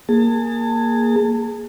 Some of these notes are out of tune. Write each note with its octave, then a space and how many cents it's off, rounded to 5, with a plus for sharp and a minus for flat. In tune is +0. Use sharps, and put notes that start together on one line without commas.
A#3 +0 G#4 +0 A5 +30